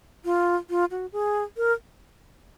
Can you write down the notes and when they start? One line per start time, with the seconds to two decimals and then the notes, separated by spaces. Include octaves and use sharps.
0.25 F4
0.70 F4
0.91 F#4
1.13 G#4
1.57 A#4